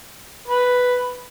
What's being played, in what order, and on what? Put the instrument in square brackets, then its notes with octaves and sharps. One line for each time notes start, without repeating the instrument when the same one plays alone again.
[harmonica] B4